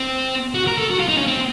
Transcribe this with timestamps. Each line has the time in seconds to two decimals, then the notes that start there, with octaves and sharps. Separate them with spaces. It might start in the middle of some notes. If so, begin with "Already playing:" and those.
Already playing: C4
0.55 F#4
0.67 A#4
0.78 A4
0.91 F#4
1.00 F4
1.09 D#4
1.18 C#4
1.27 C4